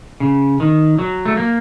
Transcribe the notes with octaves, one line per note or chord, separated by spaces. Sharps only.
C#3
D#3
F#3
A3
A#3